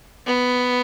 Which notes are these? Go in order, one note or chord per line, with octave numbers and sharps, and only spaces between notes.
B3